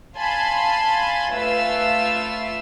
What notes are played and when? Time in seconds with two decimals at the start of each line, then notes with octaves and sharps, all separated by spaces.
0.16 F5 G#5 A5 B5 C6
1.33 A3 F4 B4 E5 F5 E6